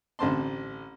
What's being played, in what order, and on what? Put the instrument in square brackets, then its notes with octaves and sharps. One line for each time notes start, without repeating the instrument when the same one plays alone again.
[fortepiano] A1 D3 C4 A5 C6